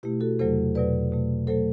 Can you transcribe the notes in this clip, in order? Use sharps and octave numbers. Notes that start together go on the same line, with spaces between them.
B2 A3 E4 G4
F#4 A4
E2 C3 F#3 A3 A4 C5
E2 B2 F#3 B4 D5
B2 A3
F#3 A3 A4 C5